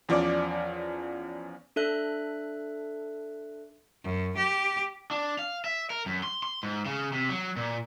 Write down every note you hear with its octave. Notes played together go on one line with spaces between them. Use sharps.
E2 F3 C#4 D5 D6
D4 A4 E5 F#6
F#2
G4
D4
F5
E5
A#4
F#2
C6
C6
G#2
C#3
C3
F#3
A#2